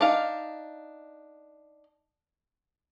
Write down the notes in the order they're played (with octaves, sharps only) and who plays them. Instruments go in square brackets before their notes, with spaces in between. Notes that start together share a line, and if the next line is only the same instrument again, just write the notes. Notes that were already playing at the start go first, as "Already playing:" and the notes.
[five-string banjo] D4 D#4 F5